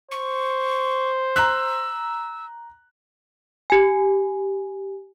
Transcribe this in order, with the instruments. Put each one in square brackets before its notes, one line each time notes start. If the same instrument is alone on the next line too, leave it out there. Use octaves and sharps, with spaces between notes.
[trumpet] C5 [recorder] C#6
[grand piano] A#5 F#6 [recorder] E6
[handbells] G4 G#5